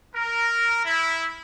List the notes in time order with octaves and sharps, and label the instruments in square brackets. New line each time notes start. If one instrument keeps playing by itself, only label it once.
[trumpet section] A#4
E4